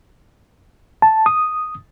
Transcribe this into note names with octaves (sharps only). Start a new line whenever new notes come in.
A5
D#6